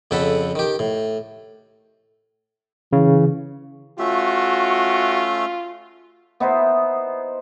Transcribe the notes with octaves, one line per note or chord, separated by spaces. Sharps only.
F2 C#3 A4 F#5 B5
D#3 G4
A2
C#3 E3
A3 C#4 F4 F#4 E5
B3 D#4 E4 C5